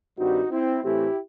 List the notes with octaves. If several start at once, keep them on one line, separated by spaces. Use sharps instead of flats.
G2 D#3 G3 C4 D#4 F#4
C4 E4
A2 E3 A3 C4 E4 G4